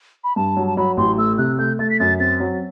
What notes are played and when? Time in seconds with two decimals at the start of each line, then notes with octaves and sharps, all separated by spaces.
0.24 B5
0.36 G2 A5
0.57 F#3
0.67 A5
0.77 F#3 B5
0.97 A1 C6
1.18 A3 E6
1.38 C3 F#6
1.59 A3 G6
1.79 A3 A6
1.90 B6
2.00 F#2 A6
2.20 C4 A6
2.40 F#3